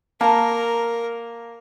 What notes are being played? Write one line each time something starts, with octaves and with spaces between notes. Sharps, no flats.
A#3 A#4 A5 A#5